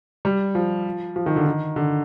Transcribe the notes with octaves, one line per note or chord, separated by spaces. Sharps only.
G3
F3
F3
D#3
D3
D#3
D3